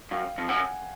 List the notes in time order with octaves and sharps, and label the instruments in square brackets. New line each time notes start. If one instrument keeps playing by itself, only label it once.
[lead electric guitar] F#2 [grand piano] F5 G5
[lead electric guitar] F2
[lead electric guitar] F#2 [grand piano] F#5 G#5